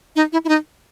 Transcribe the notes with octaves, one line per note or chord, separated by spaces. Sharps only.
D#4
E4
E4
D#4